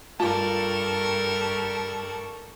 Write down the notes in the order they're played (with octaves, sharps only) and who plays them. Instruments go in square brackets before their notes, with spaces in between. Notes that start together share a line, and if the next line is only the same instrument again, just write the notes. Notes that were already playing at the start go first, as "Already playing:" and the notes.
[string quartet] G2 G3 A4 [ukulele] F4 [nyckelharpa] A#4 C#6 [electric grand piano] A5